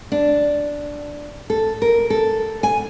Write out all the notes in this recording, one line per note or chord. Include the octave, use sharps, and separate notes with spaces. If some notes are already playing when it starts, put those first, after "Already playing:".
D4
A4
A#4
A4
G#5